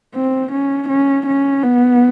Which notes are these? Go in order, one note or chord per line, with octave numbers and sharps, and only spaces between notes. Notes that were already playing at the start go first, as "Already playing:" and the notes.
C4
C#4
C#4
C#4
B3